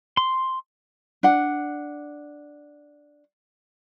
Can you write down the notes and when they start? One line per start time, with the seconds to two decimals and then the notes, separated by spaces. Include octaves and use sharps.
0.17 C6
1.23 D4 F#5